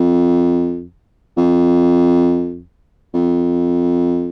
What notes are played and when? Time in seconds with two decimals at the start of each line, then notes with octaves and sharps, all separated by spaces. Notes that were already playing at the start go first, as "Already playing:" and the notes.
Already playing: F2
1.37 F2
3.14 F2